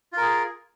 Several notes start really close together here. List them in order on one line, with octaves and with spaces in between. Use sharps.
F4 A#4 G#4